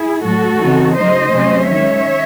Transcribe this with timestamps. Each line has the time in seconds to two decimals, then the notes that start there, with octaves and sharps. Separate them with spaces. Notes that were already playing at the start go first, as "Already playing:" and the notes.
Already playing: E4 G#4
0.23 A2 F#3 A3 F#4 A4
0.60 C#3 E3 C4 D#4
0.96 C#3 F#3 A3 D#4 C5 D#5
1.33 C3 F#3 A3 C#4
1.69 D#3 G#3 C#4 C#5 E5